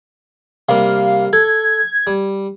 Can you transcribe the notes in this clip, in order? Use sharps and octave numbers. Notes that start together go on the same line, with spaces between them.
C3 G3 A#3 F5
A4 G#6
G3